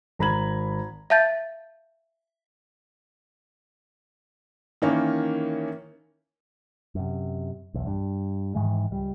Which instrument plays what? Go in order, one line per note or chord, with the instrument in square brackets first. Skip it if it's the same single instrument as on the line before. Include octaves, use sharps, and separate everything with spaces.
[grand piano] G#1 A#5 B5 G#6 F#7
[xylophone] E5 F5 A5 G6 A6
[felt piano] D#3 E3 A#3 C#4
[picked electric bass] F#2 C3
B1 E2
G2
G#2 D#3 E3 G#3
C#2 G3